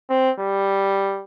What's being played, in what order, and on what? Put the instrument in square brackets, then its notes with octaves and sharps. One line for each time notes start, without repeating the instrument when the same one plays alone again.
[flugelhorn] C4
G3